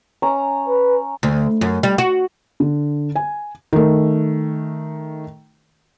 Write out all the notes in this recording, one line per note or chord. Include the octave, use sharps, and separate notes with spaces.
C#4 A#5
B4
D2
F#2
G3
F#4
D3
G#5
D#3 A3